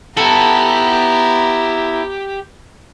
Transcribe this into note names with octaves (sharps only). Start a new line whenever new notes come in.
B3 E4 G4 A4 F#5 A#5